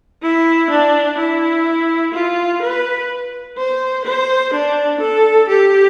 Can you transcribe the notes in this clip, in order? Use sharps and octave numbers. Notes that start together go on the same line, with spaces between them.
E4
D4
E4
F4
B4
C5
C5
D4
A4
G4